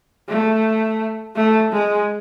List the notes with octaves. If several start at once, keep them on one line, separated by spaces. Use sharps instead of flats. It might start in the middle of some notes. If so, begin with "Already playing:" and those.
A3
A3
G#3